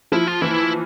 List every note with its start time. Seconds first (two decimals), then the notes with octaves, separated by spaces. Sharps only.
0.12 F3 E4
0.27 F4
0.41 E3 E4